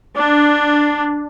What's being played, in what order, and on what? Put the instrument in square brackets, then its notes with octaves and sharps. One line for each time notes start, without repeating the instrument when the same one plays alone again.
[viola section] D4